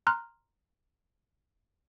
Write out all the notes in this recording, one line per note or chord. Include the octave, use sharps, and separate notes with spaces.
A#5 C6 F6 F#6